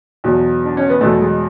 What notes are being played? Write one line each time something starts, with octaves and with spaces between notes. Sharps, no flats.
E2 B2 F#3
D4
C#4
B3
E2 B2 F#3 A3
G#3